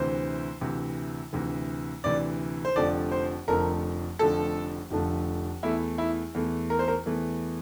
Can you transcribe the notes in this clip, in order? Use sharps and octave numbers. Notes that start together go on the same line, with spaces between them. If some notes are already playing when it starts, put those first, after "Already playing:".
Already playing: D2 C3 E3 C5
D2 C3 E3
D2 C3 E3
D2 C3 E3 D5
C5
F1 F2 D3 F3 A3 D5
C5
F1 F2 D3 F3 A3 A#4
F1 F2 D3 F3 A3 A4
F1 F2 D3 F3 A3
E2 E3 A3 E4
E4
E2 E3 A3
A#4
C5
A#4
E2 E3 A3